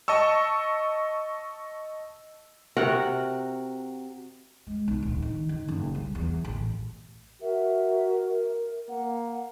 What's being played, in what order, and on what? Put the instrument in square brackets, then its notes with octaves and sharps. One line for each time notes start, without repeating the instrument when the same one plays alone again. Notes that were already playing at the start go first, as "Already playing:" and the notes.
[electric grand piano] D#5 A5 C#6 E6
[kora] C3 F#4 A#4 F#5
[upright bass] G#3
B1
D1
D#3
D#3
F#1
C2
E2
A1
[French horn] F#4 [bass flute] A#4 [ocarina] E5
[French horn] A#3 [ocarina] F#5